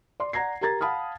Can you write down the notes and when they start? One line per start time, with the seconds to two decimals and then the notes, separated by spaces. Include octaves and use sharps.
0.20 D5 C6
0.33 D5 F#5 A#5 G#6 A#6 C7
0.61 G4 A#4 A#5 G#6 A6
0.81 F5 F#5 A5 B5 D#6 F6